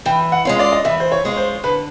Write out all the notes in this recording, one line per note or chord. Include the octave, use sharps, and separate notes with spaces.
E3 G5
F#5
G#3 C#4 F4
D5
D#5
E3 E5
C5
C#5
G#3 C#4 F4
C5
D3 B4